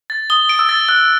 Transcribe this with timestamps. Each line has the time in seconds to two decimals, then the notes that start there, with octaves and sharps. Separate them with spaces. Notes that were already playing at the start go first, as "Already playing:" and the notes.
0.10 A6
0.30 D#6 G7
0.49 D7
0.59 E6
0.69 A6
0.88 E6 F#6